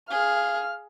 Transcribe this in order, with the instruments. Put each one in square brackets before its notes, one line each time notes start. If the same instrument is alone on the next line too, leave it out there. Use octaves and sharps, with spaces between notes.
[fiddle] G#4 [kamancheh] F5 F6